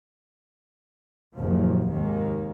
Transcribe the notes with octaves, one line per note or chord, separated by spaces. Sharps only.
F#1 D#2 A#2 F3
F1 D#2 G#2 D#3 G#3 A#3